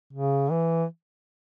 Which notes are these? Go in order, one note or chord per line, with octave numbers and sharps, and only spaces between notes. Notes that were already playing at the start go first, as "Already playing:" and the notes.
C#3
E3